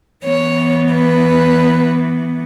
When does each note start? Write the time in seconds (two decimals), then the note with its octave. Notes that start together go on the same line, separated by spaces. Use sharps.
0.25 E3 B3 C#5
0.93 B4